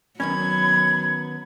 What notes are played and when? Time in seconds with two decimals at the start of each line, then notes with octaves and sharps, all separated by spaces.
0.20 D#3 F#3 B3 C#4 B5 G#6